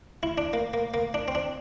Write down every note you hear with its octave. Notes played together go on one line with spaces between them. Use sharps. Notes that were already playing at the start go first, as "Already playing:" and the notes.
E4
D4
A#3
A#3
A#3
D4
C4
D4